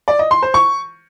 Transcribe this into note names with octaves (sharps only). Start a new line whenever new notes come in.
D5
D#5
C6
C5
C#6